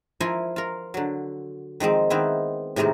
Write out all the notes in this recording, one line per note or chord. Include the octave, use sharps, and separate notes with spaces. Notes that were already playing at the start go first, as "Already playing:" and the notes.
F3 E4 F4 A#4 G#5
F4 A#4
D3 F#3
D#3 F3 G#3 C4
D#3 B3 C4 E4
A2 C3 D#3 G#3 A#3